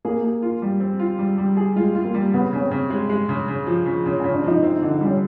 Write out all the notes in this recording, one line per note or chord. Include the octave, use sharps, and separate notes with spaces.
A#3 G#4
G#4
F4
G3
C4
F4
G3
G3
G#4
G#3 F4
F4
A#3
G3
C#3 B3
C#3 C#4
C4
C#3
G#3
G#3
C#3
C#3
F3
C#3
C#3 C#4
C#4
C#3
D4
F3 D#4
C4 D#4
D#4
D3
D#4
G3 C#4